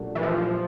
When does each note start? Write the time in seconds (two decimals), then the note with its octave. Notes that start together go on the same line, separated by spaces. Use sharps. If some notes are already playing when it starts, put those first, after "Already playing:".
Already playing: A#2 F#3 A3 D4 G4
0.15 E3
0.23 F3